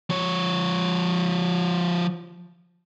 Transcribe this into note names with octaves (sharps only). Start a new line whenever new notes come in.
F3 C#5